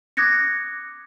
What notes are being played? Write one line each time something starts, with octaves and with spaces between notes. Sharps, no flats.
D6 D#6 F#6 G#6 A#6 C#7